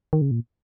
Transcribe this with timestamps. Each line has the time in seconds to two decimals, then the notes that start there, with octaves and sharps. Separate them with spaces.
0.13 D#3
0.21 C#3
0.31 A#2